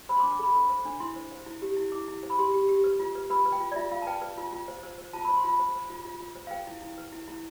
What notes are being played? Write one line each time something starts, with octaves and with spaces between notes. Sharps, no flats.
C5 B5
C6
D6
D4
D6
A4 B5
C5 B5
C5
D4
E4 C6
C5
C5
E4
G4
E4
E4 D6
E4
C5
B5
G4 C6
G4
G4
B4
F4
B4
B4 B5
B4
G5
F4
D5
F4 E5
F4 F5
A5
B4 G5
B4
F4
F4
C5
C5
C5
F4 A5
B5
C5
C6
F4 B5
C5
C5
F4
F4
F4
C5
F5
B4 G5
E4
E4
B4
E4
E4